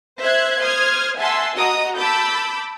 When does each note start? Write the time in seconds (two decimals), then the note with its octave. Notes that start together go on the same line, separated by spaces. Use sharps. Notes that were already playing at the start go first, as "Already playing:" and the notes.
0.20 C5 E5 F#6 G#6
0.60 C5 C6 D#6 F6 G#6
1.18 E5 F#5 G#5 A5 C6 E6
1.56 F#4 D#5 A#5 D#6
1.98 A5 B5 D6 E6 G6